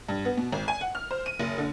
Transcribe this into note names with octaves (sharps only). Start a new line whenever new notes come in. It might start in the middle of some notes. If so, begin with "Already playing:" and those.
G2
B3
B2
G#1
G#5
F#5
F6
C5
D#7
F#1
D3